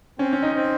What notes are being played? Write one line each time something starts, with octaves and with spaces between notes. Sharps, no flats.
C4 C#4
C#4
D#4
C4